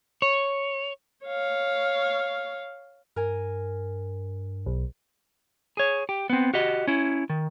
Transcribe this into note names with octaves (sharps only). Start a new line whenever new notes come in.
C#5
C#5 F5
G2 A#4 G#5
B1
G#4 C#5
G4
B3 C4
F#4 G4 D#5
C#4 E4
D#3